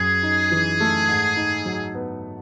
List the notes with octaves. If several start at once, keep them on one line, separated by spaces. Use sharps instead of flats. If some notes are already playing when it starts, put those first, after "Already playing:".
Already playing: F#2 G#4
D#4
E3
A3
G#2
D#4
F#3
B3